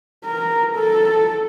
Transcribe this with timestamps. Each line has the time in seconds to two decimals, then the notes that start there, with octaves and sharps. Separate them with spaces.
0.25 A#4
0.75 A4